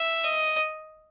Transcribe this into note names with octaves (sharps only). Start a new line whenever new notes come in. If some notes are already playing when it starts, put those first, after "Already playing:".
Already playing: E5
D#5